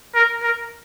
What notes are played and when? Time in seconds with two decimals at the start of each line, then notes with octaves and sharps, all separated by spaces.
0.15 A#4
0.43 A#4